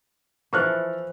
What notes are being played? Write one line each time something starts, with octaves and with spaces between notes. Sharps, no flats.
E3 F3 E4 A4 C#6 F6 F#6